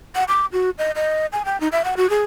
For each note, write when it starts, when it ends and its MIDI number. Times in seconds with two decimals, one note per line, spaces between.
0.15 0.24 78
0.28 0.46 86
0.52 0.70 66
0.78 0.91 75
0.96 1.26 75
1.32 1.43 80
1.45 1.59 79
1.60 1.68 63
1.72 1.82 76
1.84 1.94 78
1.97 2.10 66
2.10 2.24 68